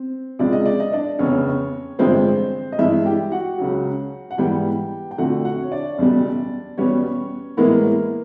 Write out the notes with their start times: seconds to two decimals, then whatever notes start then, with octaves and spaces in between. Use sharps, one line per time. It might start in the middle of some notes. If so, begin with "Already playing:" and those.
Already playing: C4
0.39 C#2 C3 F3 G#3 D5
0.53 D#5
0.66 D5
0.80 D#5
0.92 D4 D5
1.19 F1 E2 C#3 C#4 C#5
1.99 A1 G2 D3 F3 G#3 C4 C5
2.72 D#5
2.79 G2 E3 G#3 E4 E5
3.06 G4 G5
3.32 F#4 F#5
3.58 C#2 C#3 F#3
4.31 F#5
4.38 G#2 E3 G3 B3 G4 G5
5.11 G5
5.18 F2 D3 F3 A3 F#4 F#5
5.45 F#4 F#5
5.62 C#5
5.71 D4 D5
5.98 F#1 E2 B2 G3
6.78 E2 B2 G3 B3 C#4 C#5
7.57 A2 E3 G#3 A#3 B3 E4 A#4